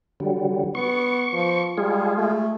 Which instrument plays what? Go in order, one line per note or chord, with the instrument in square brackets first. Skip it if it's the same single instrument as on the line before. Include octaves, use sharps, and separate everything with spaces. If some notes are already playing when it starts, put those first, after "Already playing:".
[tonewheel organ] D3 F#3 G3
[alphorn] B3 [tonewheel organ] C#6
[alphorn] F3
[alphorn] G3 [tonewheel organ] G#3 F4 G#4
[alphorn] A3